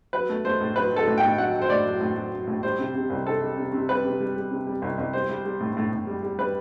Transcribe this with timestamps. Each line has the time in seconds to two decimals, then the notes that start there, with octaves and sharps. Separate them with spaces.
0.13 F#3 B4
0.29 A3
0.45 A3 C5
0.60 A2
0.76 F#3 B4
0.92 F#3 A4
1.07 A2
1.18 G5
1.23 A2
1.38 F#3 F#5
1.55 F#3
1.62 C5
1.69 A2 D5
1.86 F#3
2.00 A2
2.16 F#3
2.32 F#3
2.47 A2
2.63 G3 C5
2.79 C3
2.95 C3
3.10 C2
3.26 C3 A4
3.41 G3
3.58 C3
3.73 C3
3.89 G3 B4
4.05 C3
4.20 G3
4.36 G3
4.51 C3
4.67 G3
4.82 C2
4.98 C2
5.13 G3 C5
5.29 G3
5.45 G3
5.60 A2
5.77 A2
5.92 A2
6.07 G3
6.23 G3
6.38 G3 B4